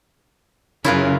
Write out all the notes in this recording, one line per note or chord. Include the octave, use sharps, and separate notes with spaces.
F#2 C#3 E4 F4 A#4 B4